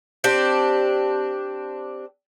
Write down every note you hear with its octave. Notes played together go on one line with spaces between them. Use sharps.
C4 D4 G4